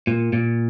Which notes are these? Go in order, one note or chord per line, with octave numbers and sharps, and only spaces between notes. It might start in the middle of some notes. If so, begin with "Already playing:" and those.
A#2
A#2